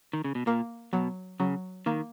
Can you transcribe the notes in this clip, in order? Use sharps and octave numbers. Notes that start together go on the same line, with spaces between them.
D#3
C#3
B2
A#2 A#3
B2 F#3
C#3 F#3
D#3 A#3